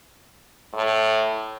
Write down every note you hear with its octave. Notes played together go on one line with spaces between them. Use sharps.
A2